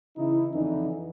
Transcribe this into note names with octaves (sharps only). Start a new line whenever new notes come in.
C#3 E3 D#4 E4
F2 D3 E3 D#4